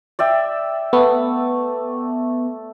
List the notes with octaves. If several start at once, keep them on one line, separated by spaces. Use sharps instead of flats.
D5 E5 G5
A3 B3